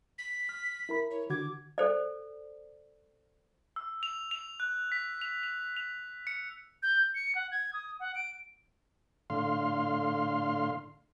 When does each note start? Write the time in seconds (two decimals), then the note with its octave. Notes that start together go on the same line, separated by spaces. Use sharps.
0.18 B6
0.49 F6
0.89 E4 A#4 B5
1.11 C#5
1.30 D3 F#4 D6 G#6
1.78 A4 C5 D5
3.76 E6
4.03 F7
4.31 F7
4.60 F#6
4.92 B6
5.21 F7
5.43 F7
5.77 F7
6.27 C#7
6.83 G6
7.15 C#7
7.35 F#5
7.51 G#6
7.73 D#6
8.00 F#5
8.15 D7
9.30 A2 D3 F5 C6